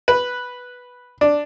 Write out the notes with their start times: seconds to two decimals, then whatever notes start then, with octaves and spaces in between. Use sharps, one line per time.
0.08 B4
1.21 D4